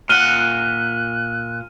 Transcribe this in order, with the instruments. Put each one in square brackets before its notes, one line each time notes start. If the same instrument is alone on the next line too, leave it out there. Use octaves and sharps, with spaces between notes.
[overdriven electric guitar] A#2 F#5 [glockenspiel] F6 D#7 G7 [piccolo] F#6